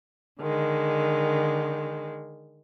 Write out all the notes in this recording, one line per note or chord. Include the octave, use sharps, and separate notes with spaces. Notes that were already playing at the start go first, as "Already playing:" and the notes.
D3 D#3 G#3